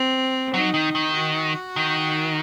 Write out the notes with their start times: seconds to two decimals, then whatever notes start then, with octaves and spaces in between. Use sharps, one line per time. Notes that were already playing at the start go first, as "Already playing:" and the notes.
Already playing: C4
0.54 F#3 D#4
0.74 D#3
0.95 D#3
1.15 F#4
1.76 D#3